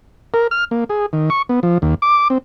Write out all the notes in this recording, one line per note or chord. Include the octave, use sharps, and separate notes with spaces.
A#4
F6
A#3
G#4
D#3
C#6
B3
F3
D#2
D6
C4